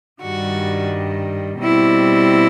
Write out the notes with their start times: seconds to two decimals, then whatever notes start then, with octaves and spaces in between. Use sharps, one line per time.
0.21 G2 D#3 G3 F#4
1.59 B2 G3 C4 E4